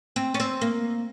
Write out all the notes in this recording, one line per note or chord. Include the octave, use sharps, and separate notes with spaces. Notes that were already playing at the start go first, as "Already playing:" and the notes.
C4
C#4
C4
A#3